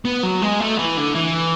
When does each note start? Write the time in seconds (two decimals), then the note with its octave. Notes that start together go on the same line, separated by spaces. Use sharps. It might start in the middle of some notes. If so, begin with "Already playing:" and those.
0.05 B3
0.23 F#3
0.42 G#3
0.60 A3
0.78 E3
0.97 D3
1.15 E3